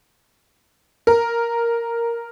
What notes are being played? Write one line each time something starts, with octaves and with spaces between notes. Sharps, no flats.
A#4